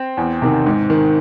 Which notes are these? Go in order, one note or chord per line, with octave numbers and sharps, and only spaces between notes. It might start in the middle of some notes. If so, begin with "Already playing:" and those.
Already playing: C4
E2
C3 D#3
G#2
D#3